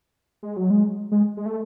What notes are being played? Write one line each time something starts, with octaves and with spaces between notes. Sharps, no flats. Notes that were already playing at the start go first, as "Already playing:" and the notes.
G#3
F#3
G#3
G#3
G#3
A3